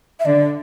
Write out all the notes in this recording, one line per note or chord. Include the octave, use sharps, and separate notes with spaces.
E5
D3 D5